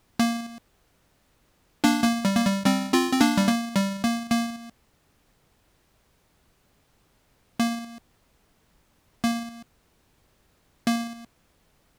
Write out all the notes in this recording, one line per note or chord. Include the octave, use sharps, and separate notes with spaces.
A#3
A#3 D4
A#3
G3
A#3
G3
G3 C4
C4 F4
C4
A#3 D4
G3
A#3
G3
A#3
A#3
A#3
A#3
A#3